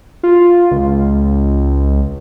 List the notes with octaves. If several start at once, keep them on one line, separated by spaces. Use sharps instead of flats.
F4
C#2